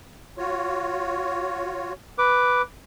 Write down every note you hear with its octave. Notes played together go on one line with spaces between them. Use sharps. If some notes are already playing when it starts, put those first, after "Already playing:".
F4 F#4 C#5
B4 D6